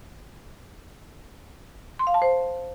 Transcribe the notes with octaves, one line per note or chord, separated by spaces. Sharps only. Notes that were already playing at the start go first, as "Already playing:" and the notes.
C6
F5
A5
C5